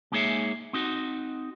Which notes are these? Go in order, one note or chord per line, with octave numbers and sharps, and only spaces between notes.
G#3 A#3 D#4 G#4 C#5 E5
C4 D#4 F#4